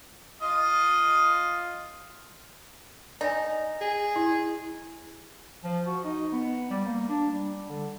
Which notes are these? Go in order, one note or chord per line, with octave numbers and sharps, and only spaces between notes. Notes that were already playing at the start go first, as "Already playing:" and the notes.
F4 D#5
D#4 D5 G#5
G#4
E4
F3
F#4
D#4
B3
G3
A#3
D4
G3
D3